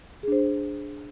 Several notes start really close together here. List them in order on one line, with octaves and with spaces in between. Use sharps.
G#4 D4 C5